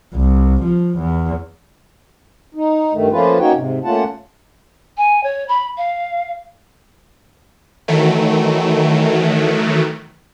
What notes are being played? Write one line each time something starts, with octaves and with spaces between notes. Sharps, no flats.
C2
F3
E2
D#4
G2 D#3 A3
F3 A3 A#3 C#4 F4 B4
A#3 C#4 D#4 F#4 C#5 G5
G#2 C3
A3 A#3 C#4 F4 F#5 A5
G#5
C#5
B5
F5
D#3 E3 F#3 A3